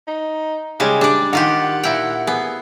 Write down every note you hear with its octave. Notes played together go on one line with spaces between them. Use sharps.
D#4
C#3 G3 G#3 G4
D4 G4 D5
D#3 F4 G4 F#5
A#2 E4 G5
B3 G#4